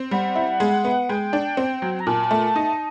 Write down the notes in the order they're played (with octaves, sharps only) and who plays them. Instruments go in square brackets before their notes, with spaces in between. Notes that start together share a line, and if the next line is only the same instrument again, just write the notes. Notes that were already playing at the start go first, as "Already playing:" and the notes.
Already playing: [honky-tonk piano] C4
[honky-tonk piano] G3 [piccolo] F#5
[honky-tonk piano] E4
G#3
B3
[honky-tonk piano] G#3 [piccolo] G5
[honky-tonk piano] D4
C4
F#3
[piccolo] A#5
[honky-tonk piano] A#2 [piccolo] A5
[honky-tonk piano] A3
D#4